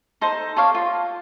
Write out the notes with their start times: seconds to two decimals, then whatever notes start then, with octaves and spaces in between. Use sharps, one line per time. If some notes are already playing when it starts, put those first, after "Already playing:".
0.21 D#4 A4 C5
0.56 A4 C#5 F5 D6
0.75 F4